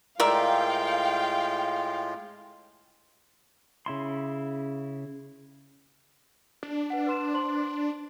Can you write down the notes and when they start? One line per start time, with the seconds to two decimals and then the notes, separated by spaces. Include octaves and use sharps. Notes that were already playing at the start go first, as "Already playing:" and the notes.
0.20 A2 G#3 F4 A#4 D5 E5 F5 G5
3.86 C#3 E4 C6
6.63 D4
6.90 B4 F#5
7.07 B4 C6 E7
7.33 C5 C6 F#7